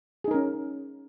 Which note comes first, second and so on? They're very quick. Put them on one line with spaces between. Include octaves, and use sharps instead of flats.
G#4 D#4 A#4 C#4